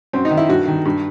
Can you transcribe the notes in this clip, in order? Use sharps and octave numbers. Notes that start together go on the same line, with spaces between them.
F#2 C4
D#4
D#3
E4
G2 F#4
D#3
G2